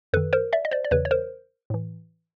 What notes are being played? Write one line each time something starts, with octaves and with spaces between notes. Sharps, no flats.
F#2 D#3 A4 B4
A#4 C5
D5 E5
D#5
C5 D5
D5
E2 C#3 E3 B4 C#5
C#5
A#4 C5
A2 E3